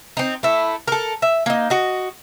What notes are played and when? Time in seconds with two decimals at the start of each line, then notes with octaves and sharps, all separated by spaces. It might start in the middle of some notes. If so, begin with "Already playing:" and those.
0.17 C4 D#4
0.43 A3 E4
0.88 A4 A#4
1.22 E5
1.46 A#3 D#4
1.70 F#4 D#5